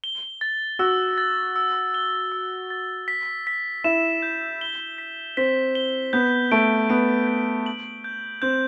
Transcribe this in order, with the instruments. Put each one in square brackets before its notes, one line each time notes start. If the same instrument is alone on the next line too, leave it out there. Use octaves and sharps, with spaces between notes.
[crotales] G7
A6
[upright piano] F#4 [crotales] E6
[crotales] A6
E6
G7
E6
A6
B6
B6
[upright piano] E4 [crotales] E7
[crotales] G6
G7
B6
[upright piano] C4 [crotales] B6
[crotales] G7
[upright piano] B3 [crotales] G6
[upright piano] A3 [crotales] D7
[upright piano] B3 [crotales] D7
[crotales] G6
F#7
G6
[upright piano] C4 [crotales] G6